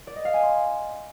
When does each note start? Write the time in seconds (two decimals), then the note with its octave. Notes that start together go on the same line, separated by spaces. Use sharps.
0.07 D5
0.16 D#5
0.25 F5
0.34 G#5
0.43 C6